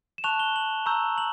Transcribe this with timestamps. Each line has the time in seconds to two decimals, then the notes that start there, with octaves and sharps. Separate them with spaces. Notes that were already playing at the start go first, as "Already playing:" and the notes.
0.18 E7
0.24 A5 C#6 F#6 F7
0.39 G7
0.56 F#7
0.86 A#5 C#6 E6 G6
1.18 F#7